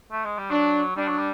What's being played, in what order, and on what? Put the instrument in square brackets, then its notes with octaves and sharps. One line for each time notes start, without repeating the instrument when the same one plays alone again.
[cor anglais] A3
G#3
G3
[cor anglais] F#3 [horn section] D4
[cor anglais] G3 [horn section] D4
[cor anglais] F#3
G3